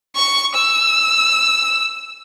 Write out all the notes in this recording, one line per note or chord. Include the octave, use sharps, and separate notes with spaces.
C#6
E6